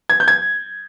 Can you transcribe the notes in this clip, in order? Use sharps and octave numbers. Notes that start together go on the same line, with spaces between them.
G#6
G6
G#6